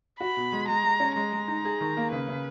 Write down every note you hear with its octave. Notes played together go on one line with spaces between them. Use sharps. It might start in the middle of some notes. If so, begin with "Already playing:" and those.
F#4 B5
B2
G#3
G#3 A#5
G#3
C#4
G#3 A#5
G#3
D#4
G#4
D#3
A#3
C#3 B4
C#3